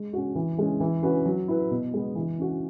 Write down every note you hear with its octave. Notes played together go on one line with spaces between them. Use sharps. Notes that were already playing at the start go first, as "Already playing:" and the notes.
Already playing: G#3
C#4 F#4
E3
G#3 C#4
E3
C#4 F#4 B4
F#3
E4 B4
B2
G#3 B3
E3
C#4 F#4